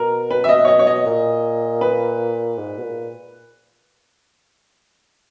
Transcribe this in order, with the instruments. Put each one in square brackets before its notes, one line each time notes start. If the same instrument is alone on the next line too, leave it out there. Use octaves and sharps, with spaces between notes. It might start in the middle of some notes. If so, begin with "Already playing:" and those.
Already playing: [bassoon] B2 [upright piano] A#4
[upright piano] B4
E5
D#5
C#5
D#5
C#5
D#5
[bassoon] A#2
[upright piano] B4
[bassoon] G#2
B2
A#2